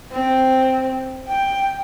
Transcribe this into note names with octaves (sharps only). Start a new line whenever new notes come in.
C4
G5